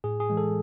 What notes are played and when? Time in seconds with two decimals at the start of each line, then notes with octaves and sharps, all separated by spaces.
0.04 A2 G#4
0.20 G#4
0.30 E3 G#3
0.37 A4